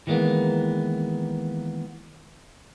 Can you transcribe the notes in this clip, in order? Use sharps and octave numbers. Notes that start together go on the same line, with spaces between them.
D#3 E3 G#3 A#3 B3